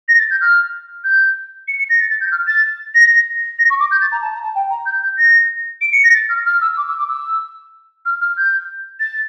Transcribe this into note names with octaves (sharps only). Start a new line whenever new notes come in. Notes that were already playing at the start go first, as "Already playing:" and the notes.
A#6
A6
G6
F6
G6
C#7
C#7
A#6
A6
A6
G6
F6
A6
A#6
A#6
C#6
D6
G6
A6
A#5
A5
A#5
A5
G5
A#5
G6
G6
A#6
D7
C#7
A#6
A6
F6
F6
E6
D6
E6
D6
E6
F6
F6
G6
A6